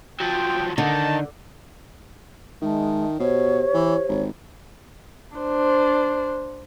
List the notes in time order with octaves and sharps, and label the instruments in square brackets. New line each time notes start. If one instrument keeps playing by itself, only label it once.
[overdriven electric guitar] F3 F#3 [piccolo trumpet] G5
[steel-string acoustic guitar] D3 [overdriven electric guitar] D#3 D#4 [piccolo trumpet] A5
[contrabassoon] D#3 [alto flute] G#3 [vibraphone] E5 A5
[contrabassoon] B2 [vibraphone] G4 C5 [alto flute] C#5
[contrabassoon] E3
G#1
[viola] D4 C5